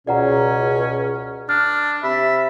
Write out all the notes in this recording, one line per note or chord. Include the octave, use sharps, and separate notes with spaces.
C#2 B2 C#4 D5 F#5 A#5
D4 F6
C3 E5 B5